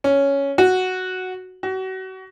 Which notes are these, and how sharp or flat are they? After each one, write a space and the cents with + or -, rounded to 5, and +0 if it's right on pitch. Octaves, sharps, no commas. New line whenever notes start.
C#4 +5
F#4 +0
F#4 +35